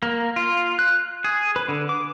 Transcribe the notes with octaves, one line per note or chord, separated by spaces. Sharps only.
A#3
F4
F#6
G#4
B4
D3
D6